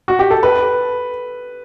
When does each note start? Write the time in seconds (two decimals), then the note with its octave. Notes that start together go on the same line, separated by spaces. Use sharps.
0.08 F#4
0.19 G4
0.30 A4
0.43 B4